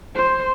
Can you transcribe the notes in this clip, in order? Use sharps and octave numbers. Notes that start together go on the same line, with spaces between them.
C5